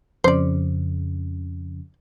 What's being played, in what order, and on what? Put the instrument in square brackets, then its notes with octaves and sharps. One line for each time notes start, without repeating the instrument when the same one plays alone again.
[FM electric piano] F2 C#3 [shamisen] C5 D5